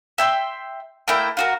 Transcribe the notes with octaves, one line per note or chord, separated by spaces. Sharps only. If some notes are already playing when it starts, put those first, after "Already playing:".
E5 G5 C6
A3 A#3 E4 G5
F4 F#4 A#4